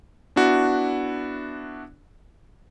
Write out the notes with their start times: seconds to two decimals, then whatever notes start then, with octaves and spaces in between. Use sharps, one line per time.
0.36 B3 D4 E4 F#4